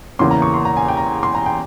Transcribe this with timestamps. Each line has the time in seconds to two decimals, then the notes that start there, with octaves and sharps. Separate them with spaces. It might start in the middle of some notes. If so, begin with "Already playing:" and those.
0.19 E2 C#3 E3 A#3 C#4 C6
0.31 A#5
0.42 C#6
0.54 C6
0.65 A#5
0.77 G#5
0.88 G5
0.97 A#5
1.23 C6
1.35 A#5
1.46 G5